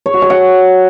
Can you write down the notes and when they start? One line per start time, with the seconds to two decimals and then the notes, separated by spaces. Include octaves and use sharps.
0.06 C#5
0.14 F#4
0.22 G#5
0.30 F#5